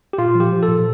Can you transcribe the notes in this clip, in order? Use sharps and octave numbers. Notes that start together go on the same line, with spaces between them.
G4
A#2 F4
F3
G4
F3
A4
A#2